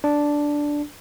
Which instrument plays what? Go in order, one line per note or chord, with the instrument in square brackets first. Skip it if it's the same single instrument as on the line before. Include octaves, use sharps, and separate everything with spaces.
[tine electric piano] D4